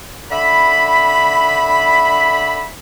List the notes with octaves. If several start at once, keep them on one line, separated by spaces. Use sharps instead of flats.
D3 E5 B5